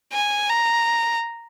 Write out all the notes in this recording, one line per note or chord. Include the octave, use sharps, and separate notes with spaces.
G#5
A#5